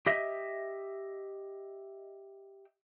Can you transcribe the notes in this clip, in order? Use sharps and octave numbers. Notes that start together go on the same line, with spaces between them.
G4 D#5 E5